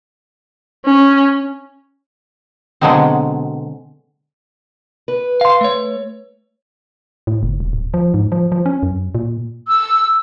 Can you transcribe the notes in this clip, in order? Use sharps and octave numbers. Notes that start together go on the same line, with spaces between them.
C#4
B2 D3 F#3 G#3 A#3 C4
B4
F5 C6
A3 C#5
A2
F#1
D#1
D1
F3
G#2
F3
F3
C#4
F#2
A#2
E6